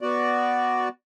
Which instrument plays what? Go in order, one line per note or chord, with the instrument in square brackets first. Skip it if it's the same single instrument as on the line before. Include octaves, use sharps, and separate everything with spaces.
[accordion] B3 F#4 D5